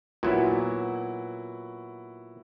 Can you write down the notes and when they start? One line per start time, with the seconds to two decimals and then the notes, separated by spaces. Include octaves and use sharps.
0.23 A#2 F#3 B3 E4 F#4